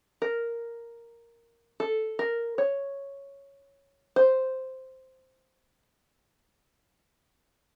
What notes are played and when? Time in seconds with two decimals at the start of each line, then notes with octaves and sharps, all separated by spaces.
0.22 A#4
1.80 A4
2.19 A#4
2.58 C#5
4.16 C5